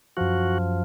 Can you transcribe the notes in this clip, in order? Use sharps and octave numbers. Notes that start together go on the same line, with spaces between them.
F#2 F3 F#4